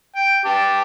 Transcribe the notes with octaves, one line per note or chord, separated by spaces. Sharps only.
G5
G4 A5